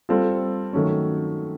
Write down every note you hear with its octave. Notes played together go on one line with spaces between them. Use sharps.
G3 C4 F4 A4
D#3 F#3 A3 C#4